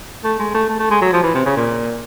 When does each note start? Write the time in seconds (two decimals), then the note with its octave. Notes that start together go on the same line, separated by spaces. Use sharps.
0.24 A3
0.39 G#3
0.54 A3
0.69 A3
0.79 A3
0.91 G#3
1.02 F#3
1.13 F3
1.23 E3
1.34 C3
1.46 C#3
1.57 A#2